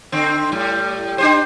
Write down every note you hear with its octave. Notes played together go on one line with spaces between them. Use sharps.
D3 C4
A2 G3
D4 G4 C5